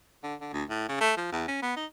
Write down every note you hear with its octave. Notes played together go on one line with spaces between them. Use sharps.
D3
D3
D2
A2
C#3
A3
F3
E2
C#4
B3
D#4